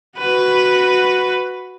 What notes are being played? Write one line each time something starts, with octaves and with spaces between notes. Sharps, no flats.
F#4 B4